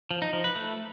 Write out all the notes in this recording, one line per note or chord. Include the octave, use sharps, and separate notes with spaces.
F3
D#4
F3
B4
A3